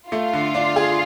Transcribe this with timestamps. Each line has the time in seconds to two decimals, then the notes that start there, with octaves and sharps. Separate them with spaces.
0.11 A3 F4
0.33 D3
0.54 D4
0.76 G#4